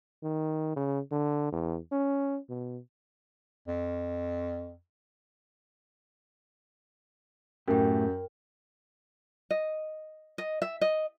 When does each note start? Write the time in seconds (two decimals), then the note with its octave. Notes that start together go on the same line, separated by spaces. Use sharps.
0.23 D#3
0.76 C#3
1.12 D3
1.52 E2
1.92 C#4
2.49 B2
3.68 F2
7.68 F#2 A2 A3 G4 A#4 G5
9.50 D#5
10.38 D#5
10.62 E5
10.81 D#5